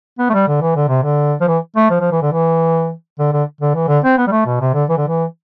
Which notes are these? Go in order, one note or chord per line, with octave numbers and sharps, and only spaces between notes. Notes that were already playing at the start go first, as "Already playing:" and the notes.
B3
A3
G3
D3
E3
D3
C3
D3
F3
E3
A3
F3
F3
E3
D3
E3
D3
D3
D3
E3
D3
C4
B3
G3
A3
B2
C3
D3
E3
D3
E3